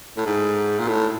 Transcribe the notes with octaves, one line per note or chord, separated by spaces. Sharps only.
A2
G#2
A#2
A2